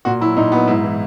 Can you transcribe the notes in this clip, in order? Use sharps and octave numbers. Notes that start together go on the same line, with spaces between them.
A#2 F#4
F#3 E4
A#2 D#4
F#3 B3
G#2 E4
E3